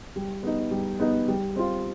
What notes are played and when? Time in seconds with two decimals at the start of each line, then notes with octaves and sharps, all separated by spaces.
0.16 G3
0.43 B3 D#4
0.71 G3
1.00 B3 D#4
1.28 G3
1.56 C4 F4